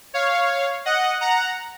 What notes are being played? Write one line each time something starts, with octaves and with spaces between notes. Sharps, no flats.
C#5 F5
D#5 F#5
F#5 A#5